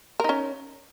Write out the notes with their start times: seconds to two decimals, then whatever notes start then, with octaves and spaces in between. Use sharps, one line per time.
0.20 A#4
0.24 D#4
0.29 C#4